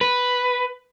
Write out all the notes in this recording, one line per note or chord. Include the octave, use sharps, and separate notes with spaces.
B4